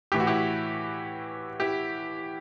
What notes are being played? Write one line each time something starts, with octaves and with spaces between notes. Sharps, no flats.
A2 E3 G4
F#4
E4 G4
E4 G4